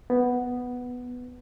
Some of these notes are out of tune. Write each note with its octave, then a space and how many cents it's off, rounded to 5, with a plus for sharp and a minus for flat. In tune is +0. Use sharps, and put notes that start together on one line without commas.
B3 +0